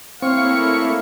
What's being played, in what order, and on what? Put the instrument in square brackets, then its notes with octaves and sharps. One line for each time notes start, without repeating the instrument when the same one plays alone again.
[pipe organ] A3 A#3 E4 [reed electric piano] C4 [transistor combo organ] C#5 C#6 [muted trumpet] F5